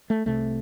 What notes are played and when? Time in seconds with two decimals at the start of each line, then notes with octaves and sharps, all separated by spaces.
0.10 A3
0.26 C2 C3 A3